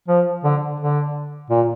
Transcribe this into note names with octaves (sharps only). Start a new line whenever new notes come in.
F3
D3
D3
A#2